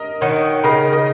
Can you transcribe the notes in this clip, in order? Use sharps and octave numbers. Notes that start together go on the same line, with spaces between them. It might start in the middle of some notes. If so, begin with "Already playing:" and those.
Already playing: A#4 D#5
D#3 C#5 F#5
C#3 A#4 D#5
A#4 D#5